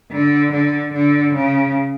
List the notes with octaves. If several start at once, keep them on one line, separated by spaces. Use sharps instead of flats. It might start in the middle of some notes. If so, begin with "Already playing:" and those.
D3
D3
D3
C#3